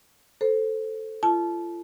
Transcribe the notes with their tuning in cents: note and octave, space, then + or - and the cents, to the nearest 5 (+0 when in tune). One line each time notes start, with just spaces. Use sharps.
A4 +0 C5 +0
F4 -35 A5 -25